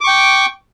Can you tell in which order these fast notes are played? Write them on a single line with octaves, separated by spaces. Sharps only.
D6 C#6 G5